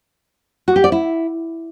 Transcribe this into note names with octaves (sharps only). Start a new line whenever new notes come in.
F#4
G4
D5
E4